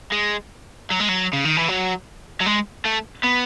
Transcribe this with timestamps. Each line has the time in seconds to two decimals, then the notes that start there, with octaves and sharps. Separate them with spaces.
0.12 G#3
0.90 F#3
0.99 G#3
1.08 F#3
1.33 C#3
1.45 D#3
1.57 E3
1.68 F#3
2.41 F#3
2.46 G#3
2.85 A3
3.24 B3